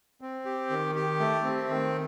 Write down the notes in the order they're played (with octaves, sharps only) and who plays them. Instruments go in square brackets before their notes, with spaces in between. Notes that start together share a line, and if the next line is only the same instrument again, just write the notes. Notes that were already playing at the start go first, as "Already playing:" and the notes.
[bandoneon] C4
G4
D#3
G4
A3
C4
D#3